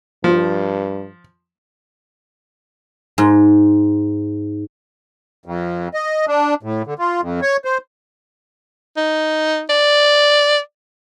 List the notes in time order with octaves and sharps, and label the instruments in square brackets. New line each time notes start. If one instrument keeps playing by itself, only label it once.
[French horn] G2 [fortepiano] F3
[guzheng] G#2
[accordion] F2
D#5
D4
A2
D3
F4
F2
C#5
C5
[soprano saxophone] D#4
D5